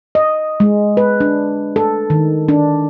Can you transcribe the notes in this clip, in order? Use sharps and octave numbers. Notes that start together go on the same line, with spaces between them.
D#5
G#3
B4
D4
A4
D#3
D4